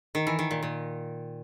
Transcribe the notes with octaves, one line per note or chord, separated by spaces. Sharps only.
D#3
E3
D#3
A#2
A#2